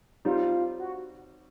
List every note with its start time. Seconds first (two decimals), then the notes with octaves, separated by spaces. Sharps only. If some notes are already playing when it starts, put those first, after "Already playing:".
0.25 G3 C4 D#4 F4
0.79 F#4